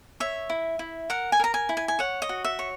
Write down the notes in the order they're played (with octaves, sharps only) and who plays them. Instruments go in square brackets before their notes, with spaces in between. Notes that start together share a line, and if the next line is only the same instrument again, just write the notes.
[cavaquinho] C#5 E5
E4
E4
A#4 F#5
G#5
A#4 A#5
G#5
E4
G#5
G#5
C#5 F#5
D#5
F#4
E5
C#5